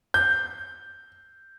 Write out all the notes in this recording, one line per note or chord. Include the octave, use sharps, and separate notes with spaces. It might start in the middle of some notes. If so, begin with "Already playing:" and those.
G6